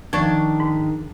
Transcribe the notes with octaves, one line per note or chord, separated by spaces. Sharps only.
D#3 F3 D4 C#6 A6
G#2